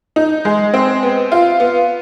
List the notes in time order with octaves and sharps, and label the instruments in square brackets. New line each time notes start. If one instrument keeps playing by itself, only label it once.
[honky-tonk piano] D#4
G#3
C4
B3
F4
B3